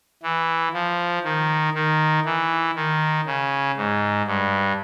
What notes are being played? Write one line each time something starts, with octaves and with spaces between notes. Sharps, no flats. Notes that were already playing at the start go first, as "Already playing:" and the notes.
E3
F3
D#3
D#3
E3
D#3
C#3
G#2
G2